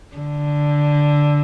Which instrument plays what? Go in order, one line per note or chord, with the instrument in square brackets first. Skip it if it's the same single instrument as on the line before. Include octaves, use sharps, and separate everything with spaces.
[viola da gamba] D3